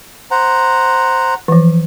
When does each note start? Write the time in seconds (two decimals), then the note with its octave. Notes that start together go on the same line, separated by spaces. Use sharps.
0.31 C5 F#5 A#5
1.48 E3 F3